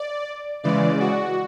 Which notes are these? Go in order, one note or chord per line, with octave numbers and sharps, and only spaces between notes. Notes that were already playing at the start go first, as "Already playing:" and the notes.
Already playing: D5
C#3 E3 G#3 D5
F#4